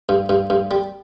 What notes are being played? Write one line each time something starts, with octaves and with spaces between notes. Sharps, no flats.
G2
G2
G2
G3